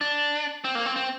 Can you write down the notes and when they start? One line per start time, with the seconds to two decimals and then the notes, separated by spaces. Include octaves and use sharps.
0.01 D4
0.64 C4
0.75 A#3
0.86 C4
0.96 C4